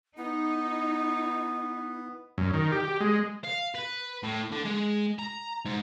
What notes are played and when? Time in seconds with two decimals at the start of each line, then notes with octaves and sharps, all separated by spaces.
0.17 B3 D#4 E4
2.38 F#2
2.54 D#3
2.72 G4
2.84 G4
3.00 G#3
3.44 F5
3.75 B4
4.23 A2
4.51 D3
4.64 G#3
5.19 A#5
5.65 G#2